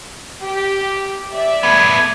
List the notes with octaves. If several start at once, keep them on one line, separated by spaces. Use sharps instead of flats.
G4
D5 E5
A3 B3 G#6